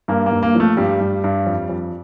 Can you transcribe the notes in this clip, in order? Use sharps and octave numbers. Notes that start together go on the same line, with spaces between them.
G2 A#3
A#3
G2
A#3
F3 A3
G2 G3
G2
G2
F2
F2